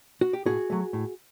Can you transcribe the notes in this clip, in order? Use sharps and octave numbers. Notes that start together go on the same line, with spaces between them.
F#4
G4
A2 F#4 G#4
F#3 A3
A2